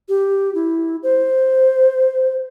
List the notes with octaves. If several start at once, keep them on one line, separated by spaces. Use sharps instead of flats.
G4
E4
C5